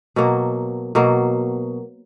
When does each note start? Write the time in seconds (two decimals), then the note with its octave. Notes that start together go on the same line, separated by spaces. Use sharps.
0.16 B2 F#3 A#3
0.95 B2 F#3 A#3